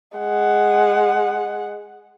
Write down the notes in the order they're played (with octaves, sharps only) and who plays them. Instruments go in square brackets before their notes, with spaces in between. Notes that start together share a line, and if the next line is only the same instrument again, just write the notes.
[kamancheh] G#3 F#5